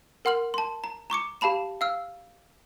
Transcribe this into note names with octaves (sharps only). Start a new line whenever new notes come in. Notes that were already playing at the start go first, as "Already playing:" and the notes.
A#4 F#5 C6 F6 F#7
A5 C6
A#5
A#5 C#6 D6 C#7
G4 F5 A5 B5 E7
F5 E6 F6